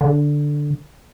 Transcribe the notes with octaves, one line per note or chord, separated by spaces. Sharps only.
D3